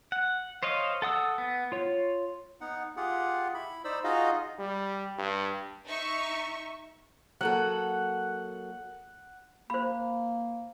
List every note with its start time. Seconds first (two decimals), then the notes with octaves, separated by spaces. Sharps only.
0.12 F#5
0.63 C5 C#5 D#5 F5
1.02 A4 F#5 D#6 E6
1.38 B3
1.72 F4 C#5
2.61 B3 D#4 F#5
2.97 F4 G4 G#4 F#5
3.54 E4 B5
3.84 D#4 C5 D5 B5 E6
4.04 D#4 F4 F#4 G#4 D#5 F5
4.59 G3
5.18 G2
5.87 D#4 E5 C#6
7.41 F#3 A#3 A4 F#5
9.70 A#3 C5 B5